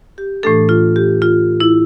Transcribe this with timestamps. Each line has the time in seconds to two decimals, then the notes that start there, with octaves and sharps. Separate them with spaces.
0.18 G4
0.43 A2 E3 A3 D4 A4
0.69 F4
0.96 G4
1.22 F4
1.60 E4